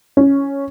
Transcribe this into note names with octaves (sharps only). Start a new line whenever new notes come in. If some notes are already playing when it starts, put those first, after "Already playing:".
C#4